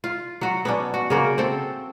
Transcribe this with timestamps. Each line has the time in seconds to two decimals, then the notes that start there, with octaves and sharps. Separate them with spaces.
0.04 F4
0.41 F#3 F#4
0.65 B3 C#4 D4
0.94 F#4
1.10 C#3 A#3 F#4
1.38 C4 A4